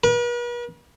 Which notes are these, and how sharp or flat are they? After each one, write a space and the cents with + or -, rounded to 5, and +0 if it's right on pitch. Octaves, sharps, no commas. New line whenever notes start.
B4 -45